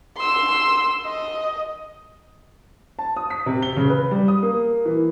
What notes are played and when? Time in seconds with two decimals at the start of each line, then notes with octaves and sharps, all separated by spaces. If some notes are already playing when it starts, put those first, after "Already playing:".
0.17 C6 E6
1.06 D#5
2.99 A5
3.17 D#6
3.30 B6
3.46 C3
3.63 G7
3.77 C#3
3.90 B4
4.11 G3
4.28 D#6
4.43 A#3
4.85 E3